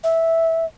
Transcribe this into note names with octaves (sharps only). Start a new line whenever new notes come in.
E5